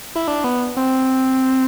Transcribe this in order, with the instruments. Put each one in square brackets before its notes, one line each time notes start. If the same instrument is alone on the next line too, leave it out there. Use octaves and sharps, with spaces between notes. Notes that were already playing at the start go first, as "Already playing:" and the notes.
[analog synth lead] E4
D4
B3
C4